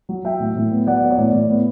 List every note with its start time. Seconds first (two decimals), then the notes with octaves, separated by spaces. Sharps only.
0.09 F#3
0.24 F#3 E5 G5
0.40 A2
0.56 A2
0.71 B3
0.87 F#3 D5 F#5
1.02 B3
1.10 C#5
1.17 A2 D5
1.33 A2
1.49 B3